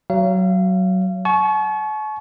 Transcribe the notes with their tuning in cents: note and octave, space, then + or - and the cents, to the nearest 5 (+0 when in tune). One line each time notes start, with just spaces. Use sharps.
F#3 +15 F5 -35
F#5 +35 A5 -45 C#6 +0